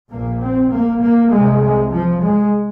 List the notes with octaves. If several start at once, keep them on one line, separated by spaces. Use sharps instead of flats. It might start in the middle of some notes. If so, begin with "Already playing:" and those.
A#1 A#2 A#3
C4
A#3
A#3
C2 C3 G#3
G#3
F3
G#3